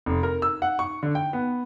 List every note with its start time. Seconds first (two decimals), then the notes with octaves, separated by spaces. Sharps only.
0.06 F1
0.23 A#4
0.42 E6
0.62 F#5
0.79 C#6
1.03 D3
1.15 G5
1.33 B3